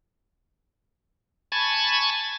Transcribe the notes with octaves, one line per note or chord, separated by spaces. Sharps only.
G#5 A5 B5 C#6 G#6 A6